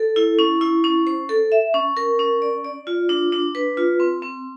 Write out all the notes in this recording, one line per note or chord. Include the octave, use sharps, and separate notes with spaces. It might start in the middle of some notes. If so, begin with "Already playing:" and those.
Already playing: A4
E4
C#4
E4
C#4
C5
A4
E5
C#4
A#4
C#4
D5
D5
F4
D4
D4
B4
F4
C4
C4